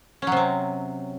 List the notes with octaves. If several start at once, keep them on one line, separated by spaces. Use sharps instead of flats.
C3 F#3 C4 C#4